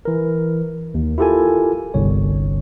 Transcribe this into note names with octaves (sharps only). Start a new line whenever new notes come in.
E3 A#4
D#2
E4 F4 G4 A4 A#4 G#5
G1 C2 C#5